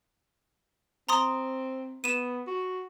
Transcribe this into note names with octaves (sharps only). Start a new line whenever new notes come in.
C4 A#5 C6 D#6
B3 D#7 E7
F#4